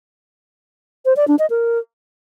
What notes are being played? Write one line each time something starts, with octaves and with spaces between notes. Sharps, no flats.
C5
D5
D4
D#5
A#4